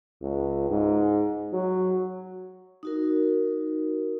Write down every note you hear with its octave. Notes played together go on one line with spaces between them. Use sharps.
C#2
G#2
F#3
D#4 F#4 A#4